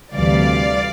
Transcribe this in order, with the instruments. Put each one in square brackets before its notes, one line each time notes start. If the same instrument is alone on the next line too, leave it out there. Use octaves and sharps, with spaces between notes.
[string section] D2 C3 E3 G3 D5 F5